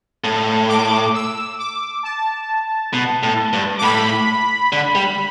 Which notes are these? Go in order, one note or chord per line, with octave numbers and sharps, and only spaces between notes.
A2
D6
E6
D6
A5
B2
A2
G2
D6
A2 B5
D3
G3